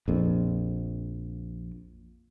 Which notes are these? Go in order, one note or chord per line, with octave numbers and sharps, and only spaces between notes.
A#1 F2